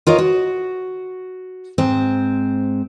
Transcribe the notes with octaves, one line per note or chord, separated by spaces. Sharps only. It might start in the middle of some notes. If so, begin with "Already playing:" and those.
F4 A#4 C#5 D#5
F#4
G#2 C4